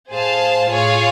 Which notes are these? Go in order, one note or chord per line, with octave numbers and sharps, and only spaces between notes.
A2 G#4 C5 F5 A5
A2 F4 G#4 C#5 F5